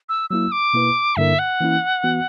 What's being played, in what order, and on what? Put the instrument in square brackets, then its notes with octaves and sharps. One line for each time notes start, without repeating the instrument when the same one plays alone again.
[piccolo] E6
[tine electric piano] F#3 A#3 E4 [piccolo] E6
[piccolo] D6
[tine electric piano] B2 A#3 E4 B4
[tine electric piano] G2 D3 A#3 E4 A#4 [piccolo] E5
[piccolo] F#5
[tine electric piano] E3 A#3 C#4 E4
E3 B3 F#4